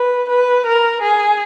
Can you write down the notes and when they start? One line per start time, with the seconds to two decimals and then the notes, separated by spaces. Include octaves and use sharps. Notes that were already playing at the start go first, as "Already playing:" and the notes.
Already playing: B4
0.29 B4
0.66 A#4
1.02 G#4